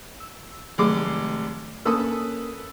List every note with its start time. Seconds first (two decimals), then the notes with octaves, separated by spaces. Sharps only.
0.20 E6
0.78 F1 D#3 F#3 G#3 A3 D6
1.85 A#3 C#4 A4 B4 C#5 D#6 E6